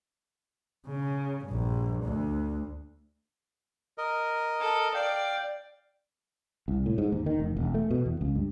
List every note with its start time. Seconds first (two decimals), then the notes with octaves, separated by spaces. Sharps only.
0.87 C#3
1.46 A#1 G2
2.05 D2
3.98 A#4 D#5
4.60 A4
4.94 D5 F5 G5
6.68 C2
6.86 A2
6.98 G#2
7.12 D#2
7.26 D#3
7.40 F1
7.57 E1
7.74 A3
7.91 B2
8.06 E2
8.21 C#2
8.35 G2